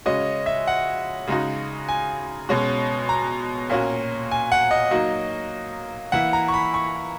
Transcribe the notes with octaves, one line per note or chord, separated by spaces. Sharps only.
C#3 G#3 C#4 F#4 D#5
E5
F#5
C#3 G#3 D#4 F#4
G#5
B2 G#3 C#4 F#4
A#5
A#2 A#3 C#4 F#4
G#5
F#5
D#5
F#3 A#3 D#4 F#4
E3 A#3 E4 F#5
A#5
C#6
B5
C#6